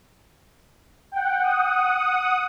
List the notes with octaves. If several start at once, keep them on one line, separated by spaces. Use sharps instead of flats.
F#5 G5
F#5 D#6